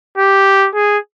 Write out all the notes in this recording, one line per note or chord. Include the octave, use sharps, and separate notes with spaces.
G4
G#4